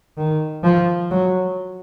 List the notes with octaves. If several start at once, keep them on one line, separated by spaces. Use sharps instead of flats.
D#3
F3
F#3